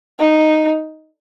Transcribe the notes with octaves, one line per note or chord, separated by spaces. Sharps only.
D#4